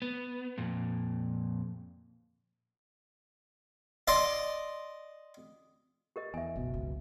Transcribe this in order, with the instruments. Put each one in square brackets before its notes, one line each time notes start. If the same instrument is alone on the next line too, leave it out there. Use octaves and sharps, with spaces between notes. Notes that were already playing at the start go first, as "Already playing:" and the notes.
[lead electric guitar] B3
F2 A#2
[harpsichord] D5 D#5 C6
[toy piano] G4 A#4 D#5
[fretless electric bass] E2 [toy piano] E5 G#5
[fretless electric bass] F#1 B2 [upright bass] B1
[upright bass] C#2